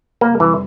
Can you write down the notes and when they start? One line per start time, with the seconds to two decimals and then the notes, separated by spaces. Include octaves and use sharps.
0.21 F2 C3 G3 A#3
0.40 E3